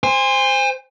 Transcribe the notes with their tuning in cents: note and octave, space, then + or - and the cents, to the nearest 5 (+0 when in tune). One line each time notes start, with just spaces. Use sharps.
C5 +0 G#5 -35